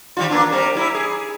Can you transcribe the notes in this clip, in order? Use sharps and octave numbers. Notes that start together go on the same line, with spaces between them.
D#3 G3 F4
A#3 B3 D4
G3 C4 A#4
G3 E4
G#4